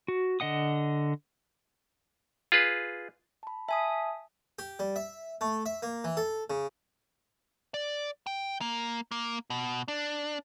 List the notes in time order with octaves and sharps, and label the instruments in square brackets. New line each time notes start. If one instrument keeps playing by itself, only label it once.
[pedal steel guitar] F#4
D3 D#5 F#5 D#6
[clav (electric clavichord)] F4 G#4 B4
[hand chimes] A5 B5
[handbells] E5 G#5 D#6 [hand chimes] A5
[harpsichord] G4
G3
E5
A3
E5
A#3
E3
A4
C#3
[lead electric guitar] D5
G5
A#3
A#3
B2
D4